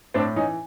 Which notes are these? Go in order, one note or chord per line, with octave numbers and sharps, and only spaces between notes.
A2 C4 D4
E3 C#4 D#4